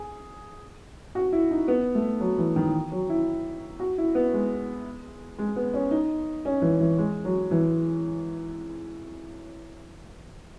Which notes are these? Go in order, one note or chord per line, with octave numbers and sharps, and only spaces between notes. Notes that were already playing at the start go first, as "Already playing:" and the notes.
Already playing: G#4
F#4
E4
D#4
B3
A3
F#3
E3
D#3
F#3
E4
F#4
E4
B3
G#3
G#3
B3
C#4
D#4
C#4
E3
E3
G#3
F#3
E3